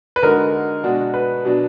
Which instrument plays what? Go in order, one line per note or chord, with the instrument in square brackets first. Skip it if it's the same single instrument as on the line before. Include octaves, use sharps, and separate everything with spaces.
[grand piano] B4
[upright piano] D3 G#3 D#4 F#4 [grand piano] A#4
[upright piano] B2 G#3 D4 F#4
[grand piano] B4
[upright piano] B2 F#3 D4